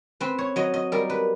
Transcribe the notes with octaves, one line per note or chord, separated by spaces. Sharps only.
C4 B4
C#5
F#3 D#5
D#5
G3 A#4
B4